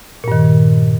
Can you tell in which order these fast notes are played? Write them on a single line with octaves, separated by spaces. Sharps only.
A#2 G2 D#3